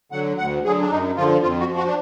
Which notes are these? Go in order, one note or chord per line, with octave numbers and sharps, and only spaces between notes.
D3 F#3 F#5
D2 F#5
D3 F#3 G#4
D4
F#2 D#4
D3 F3 F4
F2 F4
F#4
F3
F#4
D4